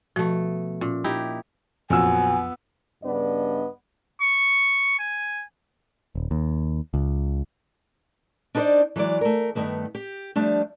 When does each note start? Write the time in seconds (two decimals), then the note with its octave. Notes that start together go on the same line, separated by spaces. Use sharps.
0.16 B2 F3 A3
0.81 A#2 C#4
1.04 D#4 E4 G4
1.90 A#1 F2 F#3 B3 G#5 E6
3.04 G2 C#3 B3 D4 D5 D#5
4.21 C#6
4.99 G#5
6.15 D#1
6.31 D#2
6.94 C#2
8.55 D4 D#4 F#4 B4 C5 D5
8.96 E3 F#3 G#3 D5
9.21 A3 A#4
9.55 G2 D#3 A3 B3
9.95 G4
10.35 F3 G3 A3 D4